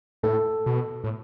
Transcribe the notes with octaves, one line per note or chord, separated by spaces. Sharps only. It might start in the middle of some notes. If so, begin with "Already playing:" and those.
A2 A4
B2
A2